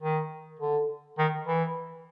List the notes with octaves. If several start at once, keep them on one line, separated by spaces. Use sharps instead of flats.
D#3
D3
D#3
E3